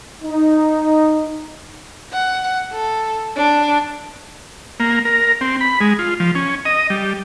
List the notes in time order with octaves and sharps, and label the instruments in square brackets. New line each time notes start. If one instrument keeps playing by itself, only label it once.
[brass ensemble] D#4
[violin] F#5
A4
D4
[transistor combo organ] A#3
A#4
C4
B5
G#3
F4
F3
C#4
D#5
G3